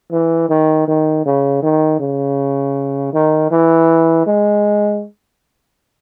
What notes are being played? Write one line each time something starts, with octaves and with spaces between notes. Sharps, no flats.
E3
D#3
D#3
C#3
D#3
C#3
D#3
E3
G#3